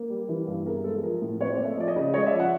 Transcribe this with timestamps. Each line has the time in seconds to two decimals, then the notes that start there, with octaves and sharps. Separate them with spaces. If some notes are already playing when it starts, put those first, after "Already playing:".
Already playing: A#3
0.10 G3
0.29 E3
0.47 G2
0.65 B3 G#4 A#4
0.84 G#3 A4
1.03 F3 G#4 A#4
1.22 A2
1.40 C4 B4 C#5
1.52 C5 D5
1.59 A3
1.65 E5
1.72 D#5
1.77 F3 D5
1.87 C#5 D#5
1.96 C#3
2.14 G#3 C#5 D#5
2.26 D5 E5
2.33 F3
2.40 E5 F#5